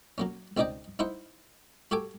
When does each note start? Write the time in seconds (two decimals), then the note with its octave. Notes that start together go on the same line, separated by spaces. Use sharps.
0.18 F#3 A#3 C#4
0.57 C#2 C4 D#4 D5 D#5 G5
0.99 D#4 E4 C5 F#5
1.91 F#4 G4 A4 G#5 D6